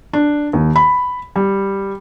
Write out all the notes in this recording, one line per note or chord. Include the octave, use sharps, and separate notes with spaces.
D4
D#2
B5
G3